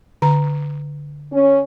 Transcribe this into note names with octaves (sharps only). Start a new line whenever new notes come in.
D3 A#5
C#4